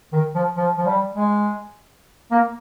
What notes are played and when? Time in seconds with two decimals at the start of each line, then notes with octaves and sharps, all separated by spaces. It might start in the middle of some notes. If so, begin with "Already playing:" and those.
0.13 D#3
0.35 F3
0.57 F3
0.78 F3
0.86 G3
1.15 G#3
2.31 A#3